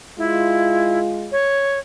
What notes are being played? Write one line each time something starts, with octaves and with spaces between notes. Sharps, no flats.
G#3 E4 F4
C#5